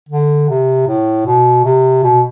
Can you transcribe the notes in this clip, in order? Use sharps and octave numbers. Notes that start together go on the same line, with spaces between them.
D3
C3
A2
B2
C3
B2